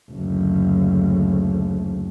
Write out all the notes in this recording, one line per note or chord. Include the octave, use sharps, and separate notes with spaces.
F#1 D2